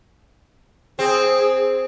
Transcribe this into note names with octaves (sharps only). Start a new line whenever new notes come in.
C4 G#4